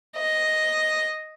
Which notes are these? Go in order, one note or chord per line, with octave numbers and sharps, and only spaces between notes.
D#5